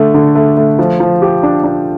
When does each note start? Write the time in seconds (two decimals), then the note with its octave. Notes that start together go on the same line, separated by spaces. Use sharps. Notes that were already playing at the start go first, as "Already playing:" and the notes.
Already playing: D3 A3
0.14 D3
0.35 A3
0.57 A3
0.79 F3
1.00 F3
1.22 G4
1.43 D4
1.64 D4